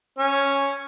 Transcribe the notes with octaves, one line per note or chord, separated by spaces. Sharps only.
C#4